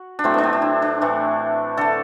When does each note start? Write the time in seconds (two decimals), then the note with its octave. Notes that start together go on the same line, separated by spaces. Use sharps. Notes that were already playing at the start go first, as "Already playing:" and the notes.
Already playing: F#4
0.19 D4
0.24 A2 F#3 A3 C4
0.34 B3 D4
0.44 C4
0.53 D4
0.62 E4
0.82 D4
1.01 A2 E3 A3
1.77 D3 A3 A4